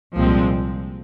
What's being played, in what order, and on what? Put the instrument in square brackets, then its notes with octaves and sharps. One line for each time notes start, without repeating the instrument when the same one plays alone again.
[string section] C2 A#2 F3 G#3 C4